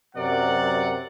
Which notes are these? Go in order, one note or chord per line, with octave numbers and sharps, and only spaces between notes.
F#2 C3 F#3 A#4 D5 F#5